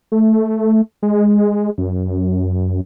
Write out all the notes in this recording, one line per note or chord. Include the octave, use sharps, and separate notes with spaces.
A3
G#3
F#2